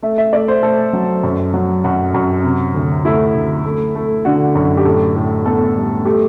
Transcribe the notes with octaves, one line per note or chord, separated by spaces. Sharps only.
A3 E5
E5
A3 D5
C5
A3 A4
F#3
F#2
F#3
F#2 F#4
F#2
C3
D2
A3 E4
D2
A3
A3
D3 F#4
F#2
G4
A2 A4
A2
B3 A4
G3
A3 G4